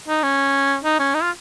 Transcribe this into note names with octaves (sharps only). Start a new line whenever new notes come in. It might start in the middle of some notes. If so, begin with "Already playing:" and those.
D#4
C#4
D#4
C#4
D#4
F4